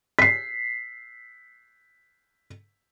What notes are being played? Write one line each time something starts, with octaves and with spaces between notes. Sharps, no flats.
B6 C7